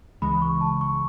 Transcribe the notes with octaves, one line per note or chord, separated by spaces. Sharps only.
C#2 C#3 E3 G#3 B5
C#6
A5
C#6